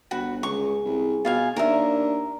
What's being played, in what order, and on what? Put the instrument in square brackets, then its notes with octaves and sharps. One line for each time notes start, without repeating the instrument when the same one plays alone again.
[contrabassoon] G1 [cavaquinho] F#4 B5
[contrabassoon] C#2 [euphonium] G#4 [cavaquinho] C#6
[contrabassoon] C2
[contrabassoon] B2 [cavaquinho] F4 F5 G#5
[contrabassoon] D#2 [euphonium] D4 [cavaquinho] A#4 E5